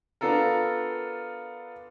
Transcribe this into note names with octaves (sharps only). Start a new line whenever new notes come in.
B3 D4 F4 A4 A#4